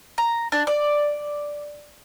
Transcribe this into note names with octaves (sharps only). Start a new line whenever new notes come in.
A#5
D4
D5